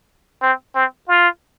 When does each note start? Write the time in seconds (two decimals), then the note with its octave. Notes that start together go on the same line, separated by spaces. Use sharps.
0.42 C4
0.75 C4
1.08 F4